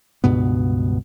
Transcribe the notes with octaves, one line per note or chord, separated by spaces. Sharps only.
C#2 G2 B2 B3